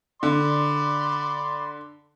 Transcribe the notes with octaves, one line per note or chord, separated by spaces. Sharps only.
D3 D5 B5 C6